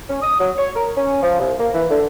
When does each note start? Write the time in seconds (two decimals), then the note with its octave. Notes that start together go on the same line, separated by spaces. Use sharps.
0.10 C#4
0.22 D#6
0.40 F#3
0.58 C#5
0.76 A#4
0.97 C#4
1.23 F3
1.40 C2
1.59 A#3
1.74 E3
1.91 D3